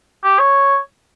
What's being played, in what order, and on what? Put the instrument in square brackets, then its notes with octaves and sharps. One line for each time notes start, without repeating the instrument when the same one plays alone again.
[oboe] G4
C#5